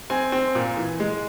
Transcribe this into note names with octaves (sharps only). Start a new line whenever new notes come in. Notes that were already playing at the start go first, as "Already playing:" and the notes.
C4 G#5
C4
A#2
E3
G#3